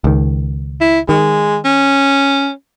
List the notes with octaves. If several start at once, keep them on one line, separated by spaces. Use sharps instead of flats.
C#2 D#3
E4
D#3 G#3
C#4